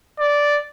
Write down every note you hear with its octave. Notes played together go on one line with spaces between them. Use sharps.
D5